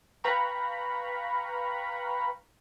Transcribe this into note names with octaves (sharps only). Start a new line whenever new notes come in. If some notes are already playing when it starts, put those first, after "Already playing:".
B4 F5 G5 A#5 B5 C#6